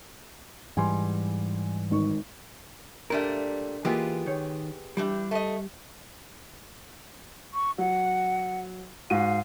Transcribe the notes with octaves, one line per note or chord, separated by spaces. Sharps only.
G#2 E3 G3 G#5 C6
G#1 D#4 C#6
A#2 G3 A3 D4 A#4
E3 G#3 A#3 B3 F4 G4
D#3 C#5
E3 G3 D4 G4
A3 D#5
C#6
F#3 F#5
G#2 F#4 F5 D#7